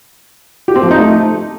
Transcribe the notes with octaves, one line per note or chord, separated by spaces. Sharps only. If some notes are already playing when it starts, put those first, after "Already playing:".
G4
C4
F3
D#4
A3